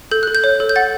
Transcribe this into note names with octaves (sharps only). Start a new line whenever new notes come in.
A4 G6
A4 F#6
G6
C#5
A4
G6
F#5 A6